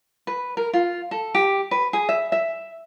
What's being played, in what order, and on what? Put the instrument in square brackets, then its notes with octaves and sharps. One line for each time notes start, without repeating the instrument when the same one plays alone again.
[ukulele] B4
A#4
F4
A4
G4
B4
G#4
E5
E5